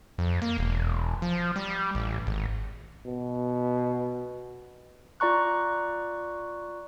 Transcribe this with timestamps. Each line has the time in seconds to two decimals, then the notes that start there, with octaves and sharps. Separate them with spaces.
0.18 F2
0.42 A#3
0.58 E1
1.22 F3
1.56 G3
1.95 A1
2.27 G#1
3.07 B2
5.20 F4 D5 A#5 C#6 F#6